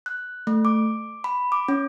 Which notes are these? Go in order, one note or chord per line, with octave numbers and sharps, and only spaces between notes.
F#6
A3
D6
B5
D6
C#4